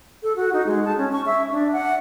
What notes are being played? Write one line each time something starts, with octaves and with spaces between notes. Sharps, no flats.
A4
F#4
D#4
G#3
A5
C#4
C#6
E5
D4
F#5